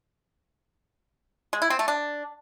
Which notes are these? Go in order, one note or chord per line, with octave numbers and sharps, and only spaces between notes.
G#3
E4
C4
A3
D4